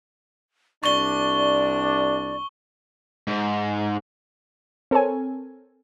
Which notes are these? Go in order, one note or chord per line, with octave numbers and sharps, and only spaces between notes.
C2 D4 D5 C#6 G7
G#2
C4 A4 A#4 C#5 G#5